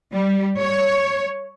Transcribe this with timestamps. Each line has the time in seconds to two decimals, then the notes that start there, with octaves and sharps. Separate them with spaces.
0.13 G3
0.59 C#5